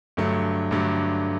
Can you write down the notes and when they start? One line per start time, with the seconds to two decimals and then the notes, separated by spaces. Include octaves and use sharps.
0.17 G2 D3 F#3 A3
0.71 G2 D3 F#3 A3